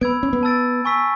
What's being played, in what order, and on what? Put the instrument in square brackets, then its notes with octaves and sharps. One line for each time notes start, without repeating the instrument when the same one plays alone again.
[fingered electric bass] B3 [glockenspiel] B5 E6 G#6 D7
[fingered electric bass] C#4
B3
[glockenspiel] A5 E6 A6 D7
G#5 C#6 E6 B6